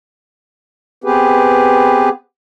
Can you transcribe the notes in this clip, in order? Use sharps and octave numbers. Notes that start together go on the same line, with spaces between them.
B3 C4 G4 G#4 B4